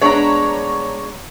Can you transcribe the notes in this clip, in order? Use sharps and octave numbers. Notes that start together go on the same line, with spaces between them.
G#3 B3 D4 C#5 A#5